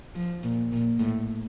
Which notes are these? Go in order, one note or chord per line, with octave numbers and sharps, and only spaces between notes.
F3
A#2
A#2
A2